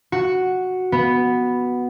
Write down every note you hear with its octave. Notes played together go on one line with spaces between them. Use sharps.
F#4
B3